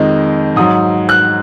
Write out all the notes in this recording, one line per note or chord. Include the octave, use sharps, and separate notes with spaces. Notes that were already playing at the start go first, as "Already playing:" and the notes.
Already playing: F2 D#3 G#3
G#2 F#3 D#6
F#6